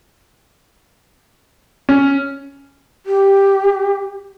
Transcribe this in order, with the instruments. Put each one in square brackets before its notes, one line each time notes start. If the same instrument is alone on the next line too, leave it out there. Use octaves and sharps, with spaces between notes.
[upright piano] C#4
[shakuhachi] G4